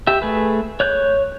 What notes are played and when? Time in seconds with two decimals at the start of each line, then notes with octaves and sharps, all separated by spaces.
0.07 G4 E5
0.22 A3 G#4 B4
0.80 C#5 F#6 G6